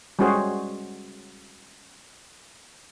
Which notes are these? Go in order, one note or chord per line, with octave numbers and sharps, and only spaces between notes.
G3 G#3 C#4 F#4 G#4 C5